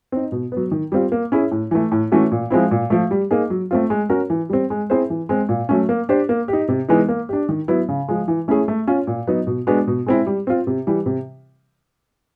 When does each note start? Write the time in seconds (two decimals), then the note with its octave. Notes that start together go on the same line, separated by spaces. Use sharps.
0.12 C4 D#4
0.32 B2
0.52 F#3 B3
0.71 D#3
0.92 G3 C4 F4
1.12 A#3
1.32 C#4 E4 G#4
1.51 A2
1.71 E3 A3
1.92 A2
2.12 E3 A3 C#4 F#4
2.32 A#2
2.50 F3 G#3 C4 E4
2.71 A#2
2.90 F3 A3
3.11 G3
3.31 A#3 D#4 G#4
3.50 F#3
3.71 A3 C4 F4
3.90 G#3
4.10 C#4 F#4 A#4
4.30 E3
4.49 G3 C4
4.70 G#3
4.90 C4 E4 G#4 C5
5.10 E3
5.29 G#3 C4
5.49 A#2
5.69 F#3 A3 C#4
5.89 A#3
6.09 D4 G4 C5
6.29 A#3
6.48 D#4 G4
6.68 C3
6.89 E3 G#3 B3 D#4
7.08 A#3
7.29 D4 G4
7.49 D#3
7.68 F#3 B3 E4
7.89 C#3
8.08 F3 G#3
8.28 E3
8.48 A3 C#4 E4 G#4
8.68 A3
8.87 C#4 F4
9.07 A#2
9.27 F#3 B3 D#4
9.47 B2
9.67 G#3 B3 D4 F#4
9.87 B2
10.06 G#3 C4 E4
10.26 G3
10.47 C4 F4
10.67 C3
10.87 E3 G3
11.06 C3